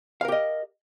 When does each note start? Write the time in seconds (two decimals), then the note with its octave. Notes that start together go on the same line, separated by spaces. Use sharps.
0.21 F5
0.25 A#4
0.28 G4
0.32 D#5